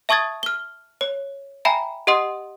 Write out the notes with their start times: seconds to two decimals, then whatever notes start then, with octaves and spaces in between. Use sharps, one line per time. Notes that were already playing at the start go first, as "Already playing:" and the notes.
0.09 E5 A5 C#6 D#6 G#6 A6
0.43 F6 G7
1.01 C#5
1.65 E5 G5 G#5 A#5 B5
2.07 G4 D#5 F#5 C6 D#6